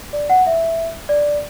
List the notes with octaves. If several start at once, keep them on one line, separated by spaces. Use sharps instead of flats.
D5
F#5
E5
D5